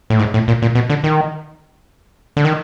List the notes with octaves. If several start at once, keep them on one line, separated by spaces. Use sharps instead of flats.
A2
G#2
A2
A#2
A#2
B2
D3
D#3
D3
D#3